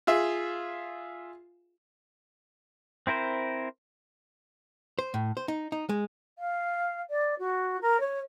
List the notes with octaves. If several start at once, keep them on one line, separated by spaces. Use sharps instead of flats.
F4 G#4 E5
C4 E4 A#4 C5
C5
A2
C5
D#4
D#4
G#3
F5
D5
F#4
A#4
C#5